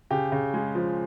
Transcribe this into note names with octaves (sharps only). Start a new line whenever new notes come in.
C#3 G4
C#3
G#3
F3